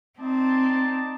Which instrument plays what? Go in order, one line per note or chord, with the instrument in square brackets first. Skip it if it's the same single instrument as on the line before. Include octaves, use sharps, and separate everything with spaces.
[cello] C4 [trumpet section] D#4 D5 A5